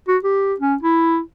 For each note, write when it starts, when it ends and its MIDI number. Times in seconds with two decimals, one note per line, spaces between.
0.08 0.18 66
0.23 0.54 67
0.60 0.75 61
0.83 1.19 64